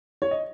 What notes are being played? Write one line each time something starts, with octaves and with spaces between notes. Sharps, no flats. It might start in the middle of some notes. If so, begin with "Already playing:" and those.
C#5
D#5